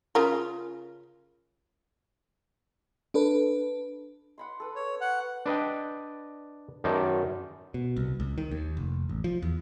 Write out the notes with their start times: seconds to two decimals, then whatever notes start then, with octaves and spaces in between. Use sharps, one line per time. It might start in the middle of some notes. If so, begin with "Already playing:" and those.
0.15 C#3 F4 A#4
3.14 D4 A4 B4
4.38 F#5 B5 C6
4.60 A4 B4
4.76 C#5
5.01 F#5
5.46 D4 B4 D#5 G5
6.84 F#2 D#3 D#4 D5 A5
7.74 B2
7.97 C2
8.20 C#2
8.38 D#3
8.51 D#2
8.77 F1
9.09 A1
9.24 F3
9.42 E2